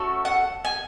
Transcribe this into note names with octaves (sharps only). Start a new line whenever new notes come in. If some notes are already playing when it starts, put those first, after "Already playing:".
Already playing: A3 C#4 F#4 A4
F#5
G#5